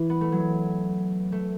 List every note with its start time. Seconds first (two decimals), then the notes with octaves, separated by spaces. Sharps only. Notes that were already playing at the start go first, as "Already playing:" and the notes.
Already playing: E3
0.10 B3
0.21 A3
0.32 F#3
1.32 A3